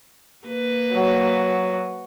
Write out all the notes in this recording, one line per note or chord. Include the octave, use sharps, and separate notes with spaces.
A#3 B4
F#3